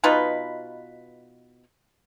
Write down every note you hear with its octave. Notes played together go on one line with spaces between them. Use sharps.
B2 D#4 F4 B4